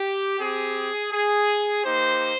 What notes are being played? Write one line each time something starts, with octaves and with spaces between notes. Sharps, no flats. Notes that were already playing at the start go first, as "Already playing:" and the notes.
Already playing: G4
C4 G4 G#4
G#4
A#3 D#4 G4 C5